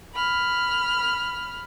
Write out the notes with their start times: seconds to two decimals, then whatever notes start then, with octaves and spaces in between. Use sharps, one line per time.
0.15 B5 F6